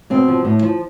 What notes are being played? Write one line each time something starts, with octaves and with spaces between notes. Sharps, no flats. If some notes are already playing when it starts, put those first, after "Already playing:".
B2 C4
F3
A2
F3